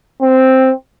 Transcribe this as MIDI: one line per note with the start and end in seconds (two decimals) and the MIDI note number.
0.21 0.72 60